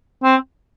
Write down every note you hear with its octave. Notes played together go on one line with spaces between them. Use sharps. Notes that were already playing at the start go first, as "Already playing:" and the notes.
C4